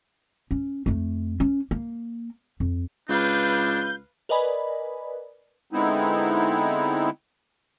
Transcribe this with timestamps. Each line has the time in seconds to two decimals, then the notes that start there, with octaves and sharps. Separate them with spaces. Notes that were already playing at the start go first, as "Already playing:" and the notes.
0.51 C#4
0.86 F2 A3
1.40 C#4
1.71 A#3
2.60 F2
3.09 C#2 D4 B4 F5 G6
4.29 A#4 B4 D5 D#5 G#5 B5
5.73 D3 G#3 B3 C4 D#4 E4